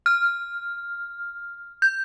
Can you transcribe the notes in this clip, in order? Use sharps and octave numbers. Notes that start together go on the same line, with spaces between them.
F6
G6